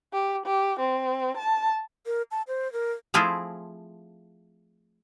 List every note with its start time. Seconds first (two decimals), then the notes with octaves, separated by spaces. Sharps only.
0.13 G4
0.46 G4
0.80 C4
1.37 A5
2.06 A#4
2.31 A5
2.48 C5
2.73 A#4
3.14 F3 A3 C4 E4 F4 G#4